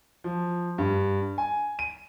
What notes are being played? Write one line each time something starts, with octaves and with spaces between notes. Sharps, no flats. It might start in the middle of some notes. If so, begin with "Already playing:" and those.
F3
G2
G#5
D#7